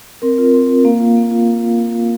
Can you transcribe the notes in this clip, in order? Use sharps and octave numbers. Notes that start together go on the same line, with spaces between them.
C4 A#4
F4
C4
F4
A#3 F5
F4
A#3
F4